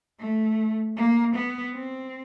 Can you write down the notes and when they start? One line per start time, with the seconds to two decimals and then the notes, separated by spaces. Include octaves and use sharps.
0.20 A3
0.97 A#3
1.35 B3
1.74 C4